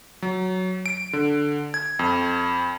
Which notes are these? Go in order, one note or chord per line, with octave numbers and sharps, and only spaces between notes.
F#3
D7
D3
G#6
F2